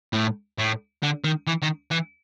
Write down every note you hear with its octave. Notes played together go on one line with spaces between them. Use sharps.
A2
A2
D3
D#3
E3
D#3
E3